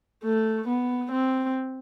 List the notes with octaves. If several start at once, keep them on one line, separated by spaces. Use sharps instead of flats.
A3
B3
C4